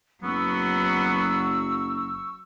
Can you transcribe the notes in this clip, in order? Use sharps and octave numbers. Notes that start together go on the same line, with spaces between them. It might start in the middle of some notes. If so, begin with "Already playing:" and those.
F#1 F#3 B3 C#6 E6